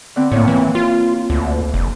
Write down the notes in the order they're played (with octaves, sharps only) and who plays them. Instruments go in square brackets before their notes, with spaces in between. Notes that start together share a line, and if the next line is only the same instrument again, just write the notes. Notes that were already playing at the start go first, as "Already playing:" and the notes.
[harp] D3 B3 C4
[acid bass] A2 [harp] A#3 C4 C#5
[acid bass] E3
F4
D2
F1